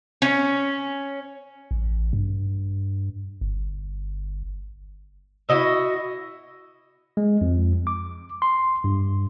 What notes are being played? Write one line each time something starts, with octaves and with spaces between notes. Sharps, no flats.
C#4
A1
G2
G1
E4 F#4 D#5 E5
G#3
F2
D6
C6
G2